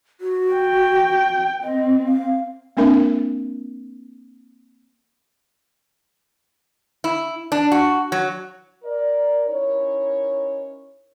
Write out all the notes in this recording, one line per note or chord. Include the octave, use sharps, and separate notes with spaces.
F#4
G5
C4 D#5
F5
G#3 A#3 C4 D4 A#4 E5
E4
D4
F#4
F#3
A#4 D5
C#4 D#4 E4 A#4 C#5